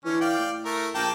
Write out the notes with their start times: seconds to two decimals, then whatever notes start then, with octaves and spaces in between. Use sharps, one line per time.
0.05 D3 E3 C#4
0.21 D5 F5 G5
0.39 A2
0.65 A3 A#4
0.95 A#1 A#3 G5 A5